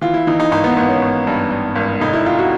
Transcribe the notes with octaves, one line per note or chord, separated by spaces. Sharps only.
E3 F4
E4
E3 D#4
D#4
G#1 D#4
B3
G#1 B3
C#4
G#1
G2
G2
G#1
F1 D#4
E4
C3 F4
F#4